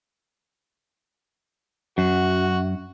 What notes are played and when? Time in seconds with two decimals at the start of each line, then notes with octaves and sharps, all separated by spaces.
1.98 F#2 F#4